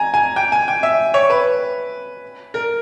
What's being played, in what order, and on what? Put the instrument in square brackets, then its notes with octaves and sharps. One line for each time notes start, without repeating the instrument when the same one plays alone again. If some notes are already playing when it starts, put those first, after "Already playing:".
Already playing: [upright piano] G#5 A#5
G#5
G5
G#5
G5
E5
C#5
B4
A#4